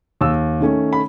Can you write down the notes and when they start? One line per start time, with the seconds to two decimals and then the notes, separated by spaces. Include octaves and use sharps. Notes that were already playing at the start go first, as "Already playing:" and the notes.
0.21 D#2 E6
0.60 D#3 A3 C#4
0.93 B5